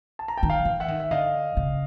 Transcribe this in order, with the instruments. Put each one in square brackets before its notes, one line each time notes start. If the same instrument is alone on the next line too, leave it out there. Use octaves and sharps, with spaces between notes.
[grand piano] A5
A#5
G5 A5
[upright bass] D#3
[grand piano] F5 G5
[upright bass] E3
[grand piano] E5 F#5
[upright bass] D#3
[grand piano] E5
[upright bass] D3 [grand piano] D#5 F5
[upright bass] C#3